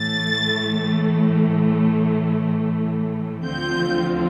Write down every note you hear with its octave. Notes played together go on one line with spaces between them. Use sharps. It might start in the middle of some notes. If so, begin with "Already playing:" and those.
Already playing: A2 E3 A3 A6
D2 D3 F3 C4 F4 G6